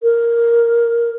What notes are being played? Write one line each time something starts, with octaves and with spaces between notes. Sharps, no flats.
A#4